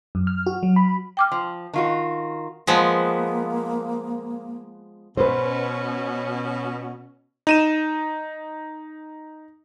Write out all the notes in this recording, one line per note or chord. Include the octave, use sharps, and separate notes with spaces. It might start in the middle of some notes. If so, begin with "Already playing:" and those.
F#2
F6
F#4
F#3
B5
G5 D6 F6
F3 C6
D#3 F4 F#4
F3 G#3 A#3 B3
B2 C#4 B4 C5
D#4 D#7 E7